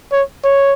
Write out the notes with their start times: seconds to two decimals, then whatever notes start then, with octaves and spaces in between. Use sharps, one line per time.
0.12 C#5
0.45 C#5